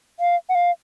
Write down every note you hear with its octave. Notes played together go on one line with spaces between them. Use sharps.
F5
F#5
F5